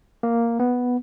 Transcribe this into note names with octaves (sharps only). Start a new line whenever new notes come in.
A#3
B3